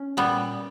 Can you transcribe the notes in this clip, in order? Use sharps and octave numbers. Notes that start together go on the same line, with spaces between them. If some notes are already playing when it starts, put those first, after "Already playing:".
Already playing: C#4
A#2 G3 B3